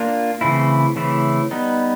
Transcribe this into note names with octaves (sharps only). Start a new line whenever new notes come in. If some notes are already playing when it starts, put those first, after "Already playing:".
Already playing: A#3 D4 F4
C#3 E3 A3 C4 E4
C#3 E3 A3 C4 E4
G3 B3 D#4